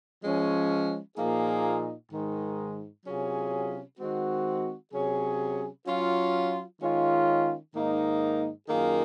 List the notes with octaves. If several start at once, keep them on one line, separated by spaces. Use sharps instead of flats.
F3 G#3 C#4
A#2 F3 A#3 D#4 G#4
G#2 D#3 G#3
C3 F#3 C#4 F4 G#4
D#3 G#3 C4 F#4
C3 F#3 C#4 G#4
F#3 C#4 F4
D#3 G#3 C#4 F4
G#2 D#3 A#3 D#4
F#2 D#3 A#3 F4 G#4